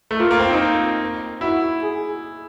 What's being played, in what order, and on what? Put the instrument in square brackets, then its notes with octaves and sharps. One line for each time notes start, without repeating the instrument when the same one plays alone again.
[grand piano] A3
[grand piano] A#3 [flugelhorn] F4
[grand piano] A#3
C4
D#4
[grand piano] E4 [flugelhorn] F#4
[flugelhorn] G#4